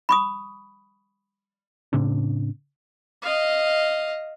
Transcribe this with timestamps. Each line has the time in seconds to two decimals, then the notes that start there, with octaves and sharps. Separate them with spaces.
0.09 B5 C#6 D#6
1.93 A2 C#3 C4 D4
3.22 D#5 F5